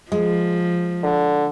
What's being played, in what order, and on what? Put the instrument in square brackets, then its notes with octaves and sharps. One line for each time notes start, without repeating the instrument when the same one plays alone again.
[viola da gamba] F3 [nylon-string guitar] G#3
[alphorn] D3